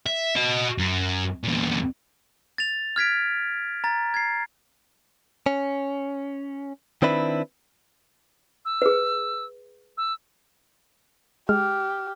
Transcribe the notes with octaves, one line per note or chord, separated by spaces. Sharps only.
E5
F#4 D#5
F#2
E2 A#2
A6 F7
F6 G#6 B6 D7
A#5 A6
G#6 C7
C#4
D#3 C4 D4 E4 B4
E6
G#4 B4
E6
G#3 G4 F6